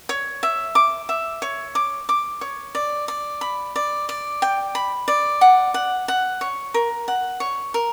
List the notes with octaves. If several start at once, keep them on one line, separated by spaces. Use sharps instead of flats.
C#5
E5
D6
E5
C#5
D6
D6
C#5
D5
D5
B5
D5
D5
G5
B5
D5
F#5
F#5
F#5
C#5
A#4
F#5
C#5
A#4